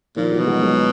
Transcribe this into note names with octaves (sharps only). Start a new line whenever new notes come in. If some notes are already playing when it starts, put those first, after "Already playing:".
A#2 D#3 F3
E3 F#3
B2
F#3 G#3
F#3 G#3